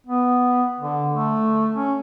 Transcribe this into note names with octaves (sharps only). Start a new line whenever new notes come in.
B3
D3
A3
C#4